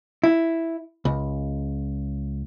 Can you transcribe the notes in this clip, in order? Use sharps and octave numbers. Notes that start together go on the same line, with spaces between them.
E4
C#2